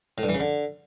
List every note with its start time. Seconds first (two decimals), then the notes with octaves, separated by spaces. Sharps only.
0.18 A2
0.23 G2
0.29 E3
0.35 C#3
0.40 D3